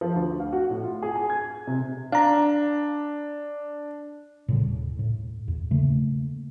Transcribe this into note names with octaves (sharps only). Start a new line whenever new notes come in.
F3
D2
F5
F#4
A2
F4
G#4
G#5
G#6
C3
D4 F5 A#5
A2 C#3 G3
D#1
A2
E2
C#3 A3 A#3